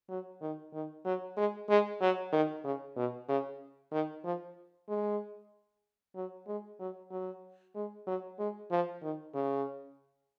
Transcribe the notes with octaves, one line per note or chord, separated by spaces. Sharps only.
F#3
D#3
D#3
F#3
G#3
G#3
F#3
D#3
C#3
B2
C#3
D#3
F3
G#3
F#3
G#3
F#3
F#3
G#3
F#3
G#3
F3
D#3
C#3